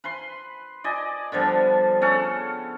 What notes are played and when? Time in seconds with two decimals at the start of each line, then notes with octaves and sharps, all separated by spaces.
0.04 B4 B5 C6
0.84 D5 D#5 G#5
1.32 D3 F3 G3 B3
2.01 C#3 C#4 A4 F#5